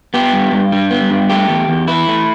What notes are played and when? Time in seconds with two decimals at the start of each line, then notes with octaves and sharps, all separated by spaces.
0.14 B3 G4
0.33 G2
0.53 G2
0.72 G3
0.91 B3
1.10 G2
1.29 A3 G4
1.49 E2
1.69 E2
1.88 E3 E4
2.08 A3